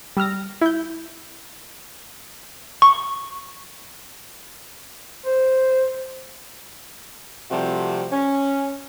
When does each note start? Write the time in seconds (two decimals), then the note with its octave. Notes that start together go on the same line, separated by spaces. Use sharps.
0.17 G3 E6 F6 A#6
0.61 E4 G6
2.82 C#6
5.26 C5
7.51 C3 F3 G3 A3 C4 F#4
8.12 C#4